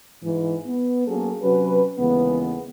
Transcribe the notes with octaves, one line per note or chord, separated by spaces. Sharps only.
G#2 E3
B3
F#3 A#3 C#4 G#4 A4
C3 F#3 C#4 F#4 B4
D#2 C#3 E3 G#3 B3